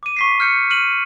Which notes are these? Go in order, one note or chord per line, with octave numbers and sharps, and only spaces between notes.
D6 D#7
C#6 B6 C7
F6 G6 C#7
F6 D#7 F#7